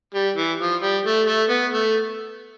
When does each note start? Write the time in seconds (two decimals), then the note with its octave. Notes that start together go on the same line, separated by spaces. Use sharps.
0.14 G3
0.36 E3
0.60 F3
0.82 G3
1.05 A3
1.27 A3
1.50 B3
1.73 A3